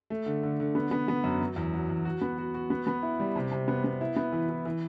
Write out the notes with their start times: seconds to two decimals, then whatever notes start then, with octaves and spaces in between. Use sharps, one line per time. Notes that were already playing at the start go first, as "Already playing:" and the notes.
0.10 A3
0.26 D3
0.43 D3
0.60 D3
0.75 B3
0.91 B3
1.08 B3
1.24 F#2
1.41 F#3
1.56 E2
1.74 F#3
1.90 E2
2.05 F#4
2.21 B3
2.38 F#4
2.54 F#4
2.70 B3
2.87 B3
3.03 E4
3.20 G3
3.36 C3
3.52 C3
3.68 B3
3.84 B3
4.01 E4
4.16 B3
4.33 E3
4.49 E3
4.65 E3